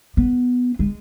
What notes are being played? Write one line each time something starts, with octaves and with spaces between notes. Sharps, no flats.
B3
G#3